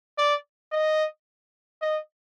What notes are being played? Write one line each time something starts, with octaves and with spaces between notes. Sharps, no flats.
D5
D#5
D#5